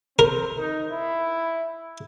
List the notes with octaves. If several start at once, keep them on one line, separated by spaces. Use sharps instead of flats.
C4 A#4
D#4
E4